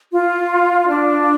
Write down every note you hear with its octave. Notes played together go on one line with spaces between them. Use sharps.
F4
D4